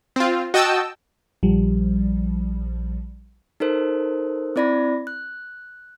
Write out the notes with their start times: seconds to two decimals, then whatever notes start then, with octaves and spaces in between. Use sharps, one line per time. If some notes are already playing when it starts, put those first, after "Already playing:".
0.16 C4 F4
0.54 F#4 D#5 G5 A5 E6
1.43 A#1 F3 G3
3.60 D#4 A4 A#4 C5
4.56 C4 E4 D5 B5 A#6
5.07 F#6